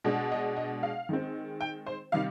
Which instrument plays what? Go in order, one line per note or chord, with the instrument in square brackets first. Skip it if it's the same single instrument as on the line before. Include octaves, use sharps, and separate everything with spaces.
[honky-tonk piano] B2 G#3 D4
D#5
D#5
F5
D#3 G#3 C4
G5
C5
C3 D#3 G3 F5